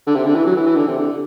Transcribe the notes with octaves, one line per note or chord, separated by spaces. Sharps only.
D3
C3
D3
E3
F#3
E3
E3
D3
C3
D3